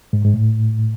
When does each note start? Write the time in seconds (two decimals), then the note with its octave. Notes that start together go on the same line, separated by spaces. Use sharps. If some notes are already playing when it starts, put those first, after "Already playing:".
0.13 G#2
0.25 G#2
0.34 A2